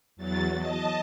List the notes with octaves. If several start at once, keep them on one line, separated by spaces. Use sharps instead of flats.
E2 F#3 A6
D#5 A5